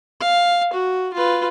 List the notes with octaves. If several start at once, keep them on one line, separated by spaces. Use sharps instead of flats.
F5
F#4
F4 B4